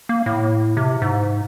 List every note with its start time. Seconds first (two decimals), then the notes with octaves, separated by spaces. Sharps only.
0.09 A#3
0.26 A2
0.77 C3
1.02 G#2